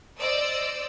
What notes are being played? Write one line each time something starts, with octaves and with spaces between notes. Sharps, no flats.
C5 D5 D#5 E6